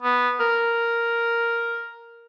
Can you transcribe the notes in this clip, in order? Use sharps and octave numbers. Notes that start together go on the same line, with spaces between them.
B3
A#4